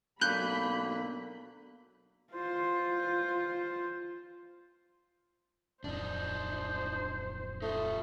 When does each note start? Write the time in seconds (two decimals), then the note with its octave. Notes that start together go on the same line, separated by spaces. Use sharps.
0.21 B2 D3 F#3 A#3 B5 F#6 G6
2.32 F4 C5
5.84 D1 F2 D4 D#4 C5
7.62 A3 D#4 F4